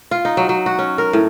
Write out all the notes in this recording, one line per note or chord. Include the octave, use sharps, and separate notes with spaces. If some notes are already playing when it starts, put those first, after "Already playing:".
F4
D#4
F#3
F#3
F#4
C#4
A#4
A2